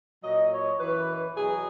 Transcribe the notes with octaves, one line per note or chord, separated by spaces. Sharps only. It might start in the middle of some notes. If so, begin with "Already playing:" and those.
A#2 F#3 D#5
C#5
F#2 E3 B4
B2 F#3 G#4